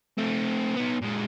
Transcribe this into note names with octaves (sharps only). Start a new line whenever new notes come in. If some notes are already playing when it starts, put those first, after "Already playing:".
A3 C4
B3 D#4
A#2 G#3